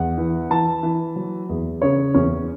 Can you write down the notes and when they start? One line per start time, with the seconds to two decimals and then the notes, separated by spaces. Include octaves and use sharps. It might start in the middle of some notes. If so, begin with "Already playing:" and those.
Already playing: E2 F#5
0.18 E3
0.50 E3 A5
0.83 E3
1.16 F#3
1.49 E2
1.82 C#3 C#5
2.14 E2 C#4